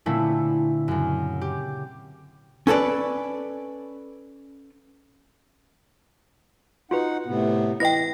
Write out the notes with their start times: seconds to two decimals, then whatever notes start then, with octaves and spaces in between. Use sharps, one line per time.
0.06 A#2 D3 A3 C4 C#4 E4
0.88 F#2 C#3
1.41 G4
2.67 C#4 A4 B4 D5
6.91 D#4 F4 F#4 B4 F#5
7.26 A2 C3 B3
7.80 E3 E4 B4 D#5 G5 A#6